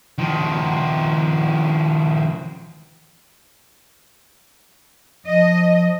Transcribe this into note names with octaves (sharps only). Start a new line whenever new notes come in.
D#3 F3
F3 D#5